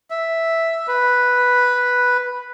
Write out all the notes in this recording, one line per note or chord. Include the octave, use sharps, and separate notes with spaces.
E5
B4